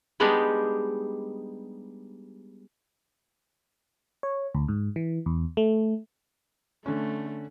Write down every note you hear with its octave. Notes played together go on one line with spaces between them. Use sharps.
G3 G#3 B3 D4 D#4 G4
C#5
D2
G#2
E3
E2
A3
D3 A3 C#4